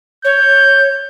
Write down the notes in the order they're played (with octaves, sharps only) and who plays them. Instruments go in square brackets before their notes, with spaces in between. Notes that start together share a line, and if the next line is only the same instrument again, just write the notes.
[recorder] C#5 [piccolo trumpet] G6